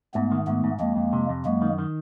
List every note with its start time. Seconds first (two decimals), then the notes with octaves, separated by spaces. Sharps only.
0.14 G#2 A3 B3
0.32 D#3
0.47 G#2 A3 B3
0.64 G#2
0.80 F2 G#3 A#3
0.96 F2
1.13 C3
1.29 F2
1.45 F#2 G#3 A#3
1.62 D#3
1.79 D#3